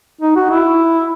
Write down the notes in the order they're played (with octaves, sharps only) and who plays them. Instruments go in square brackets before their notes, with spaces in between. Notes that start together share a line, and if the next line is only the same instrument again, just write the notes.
[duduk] D#4
F#4
E4